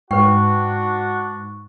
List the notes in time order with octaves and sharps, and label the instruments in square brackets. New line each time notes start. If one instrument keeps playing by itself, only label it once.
[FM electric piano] G#2 [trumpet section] D4 F#4 [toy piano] B4 G5 [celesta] C#6